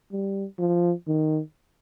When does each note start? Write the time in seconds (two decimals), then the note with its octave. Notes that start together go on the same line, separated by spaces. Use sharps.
0.12 G3
0.59 F3
1.08 D#3